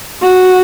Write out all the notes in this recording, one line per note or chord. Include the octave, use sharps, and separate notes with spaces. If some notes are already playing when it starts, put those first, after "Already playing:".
F#4